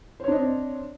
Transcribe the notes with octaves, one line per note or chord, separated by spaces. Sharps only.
C4 D4 C5 C#5 D#5